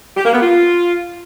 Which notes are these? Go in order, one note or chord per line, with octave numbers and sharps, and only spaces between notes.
G4
A#3
B3
F4